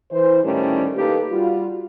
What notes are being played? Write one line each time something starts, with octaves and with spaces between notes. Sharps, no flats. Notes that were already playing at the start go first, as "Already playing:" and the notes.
E3 C5
D2 A2 D#3 G3 C#4
D#3 A#3 D#4 G4 A4 B4
G3 F4 F#4